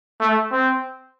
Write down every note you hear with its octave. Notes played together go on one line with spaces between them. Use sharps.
A3
C4